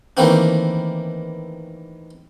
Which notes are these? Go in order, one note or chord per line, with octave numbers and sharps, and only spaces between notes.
D#3 E3 A3 A#3 C4 D4